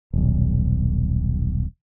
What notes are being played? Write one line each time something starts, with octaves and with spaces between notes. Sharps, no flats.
D#1 B1